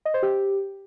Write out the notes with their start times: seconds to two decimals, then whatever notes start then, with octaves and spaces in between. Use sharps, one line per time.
0.05 D#5
0.14 C5
0.23 G4